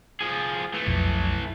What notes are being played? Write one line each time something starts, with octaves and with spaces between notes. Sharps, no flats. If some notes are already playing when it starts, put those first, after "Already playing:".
F3 G#4
E3 A3
B1 F2 F3